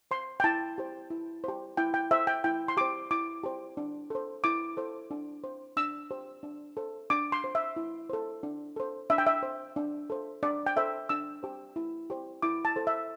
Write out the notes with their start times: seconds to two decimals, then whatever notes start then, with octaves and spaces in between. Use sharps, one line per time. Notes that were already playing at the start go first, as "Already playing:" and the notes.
0.11 C5 C6
0.40 G5
0.44 E4 A5
0.78 G4 C5
1.10 E4
1.44 G4 C5
1.77 E4 G5
1.94 G5
2.11 C5 E5
2.27 G5
2.44 E4 G5
2.68 C6
2.77 G4 C5 D6
3.11 E4 D6
3.44 G4 C5
3.77 D4
4.10 A4 C5
4.44 E4 D6
4.77 A4 C5
5.11 D4
5.44 C5
5.77 D4 E6
6.11 G4 C5
6.43 D4
6.77 A4 C5
7.10 D4 D6
7.32 C6
7.44 C5
7.55 E5
7.76 E4
8.10 A4 C5
8.43 D4
8.76 A4 C5
9.10 D4 E5
9.18 G5
9.27 E5
9.43 C5
9.76 D4
10.10 A4 C5
10.43 D4 D5
10.66 G5
10.76 A4 C5 E5
11.09 D4 E6
11.43 G4 C5
11.76 E4
12.10 G4 C5
12.42 E4 D6
12.65 A5
12.76 A4 C5
12.87 E5